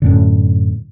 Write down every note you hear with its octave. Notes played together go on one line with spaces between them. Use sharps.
F#2 A2 D3